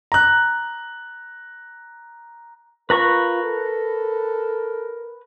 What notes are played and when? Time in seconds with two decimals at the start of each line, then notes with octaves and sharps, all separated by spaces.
0.12 A#5 F#6
2.90 F4 A#4 B4 A#5 C#6
3.43 A4